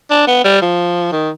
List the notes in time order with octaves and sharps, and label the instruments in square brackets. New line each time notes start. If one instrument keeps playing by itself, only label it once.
[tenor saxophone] D4
B3
G3
F3
D#3